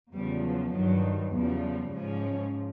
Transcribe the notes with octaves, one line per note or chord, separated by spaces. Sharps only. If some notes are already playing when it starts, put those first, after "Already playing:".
E2 C#3 F3 G3
F#3
G2 D#3 F#3
E2 C#3 F3 G3
G#2 F3 C#4